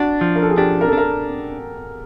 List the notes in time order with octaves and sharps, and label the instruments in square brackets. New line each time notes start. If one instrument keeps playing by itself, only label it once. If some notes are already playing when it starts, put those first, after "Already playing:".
Already playing: [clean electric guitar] D4 [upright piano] F#4
[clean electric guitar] F3
[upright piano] A#4
A4
G#4
[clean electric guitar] D4 [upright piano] G4
[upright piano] A#4
A4
[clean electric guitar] D4 [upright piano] A#4